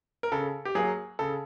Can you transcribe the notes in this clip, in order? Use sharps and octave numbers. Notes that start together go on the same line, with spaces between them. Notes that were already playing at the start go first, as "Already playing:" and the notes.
A#4
C#3 A4
G4
F#3 A#3 G#4
C#3 A4